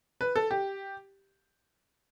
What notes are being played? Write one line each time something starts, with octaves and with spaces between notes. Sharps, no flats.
B4
A4
G4